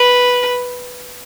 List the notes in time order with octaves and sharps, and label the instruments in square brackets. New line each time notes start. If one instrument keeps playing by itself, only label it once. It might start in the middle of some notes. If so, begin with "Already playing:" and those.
Already playing: [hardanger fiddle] B4